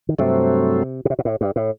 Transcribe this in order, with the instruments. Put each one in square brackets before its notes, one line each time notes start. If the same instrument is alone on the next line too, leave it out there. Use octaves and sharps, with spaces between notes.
[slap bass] D#3
[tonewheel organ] G2 F#3 A3 C4 [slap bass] C3
[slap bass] B2
C3
B2
A2
G2
A2